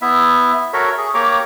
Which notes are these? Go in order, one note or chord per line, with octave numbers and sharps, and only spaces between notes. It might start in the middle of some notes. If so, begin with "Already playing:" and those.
B3 E4 E5
F#4 A4 A#4 C#5 E5
G#4
A#3 G4 C#5 A#5 C#6 D6